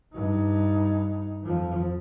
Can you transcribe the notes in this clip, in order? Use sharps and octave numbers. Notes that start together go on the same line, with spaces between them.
G2 D#4
F2 F3